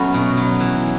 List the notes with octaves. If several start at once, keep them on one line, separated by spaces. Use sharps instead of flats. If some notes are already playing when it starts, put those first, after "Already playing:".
Already playing: F#3 A3 B3 C#4
B2
F#3
E3